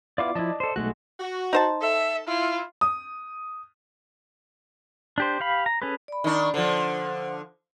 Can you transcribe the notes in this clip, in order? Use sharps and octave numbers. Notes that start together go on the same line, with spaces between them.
B3 E4 F4 D5 F5 D6
F3 E4 D5 D#5 A5
A4 C5
B1 G#3 A3 F#4 F#6
F#4
D#4 C5 A5
A4 E5
E4 F4
D#6
D4 G4 C5
G4 F5 B5
A#5
C#4 G#4 A4 B4
D5 B5
D#3 D4
D3 F3 C5 F#5